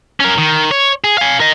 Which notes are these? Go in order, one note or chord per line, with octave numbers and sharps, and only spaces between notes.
C#4 A#4
D#3
C#5
G#4
F5 G#5
A#4 D#5